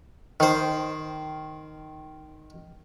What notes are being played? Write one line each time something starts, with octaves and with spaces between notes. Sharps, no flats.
D#3 C5